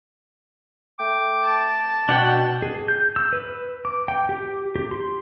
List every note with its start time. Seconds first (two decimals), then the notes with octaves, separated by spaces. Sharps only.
0.98 A3 G5 D6
1.45 A5
2.09 B2 D4 F#5 G5
2.62 G#4
2.88 G6
3.16 E6
3.33 B4
3.85 D6
4.08 G5
4.29 G4
4.76 G4
4.91 C6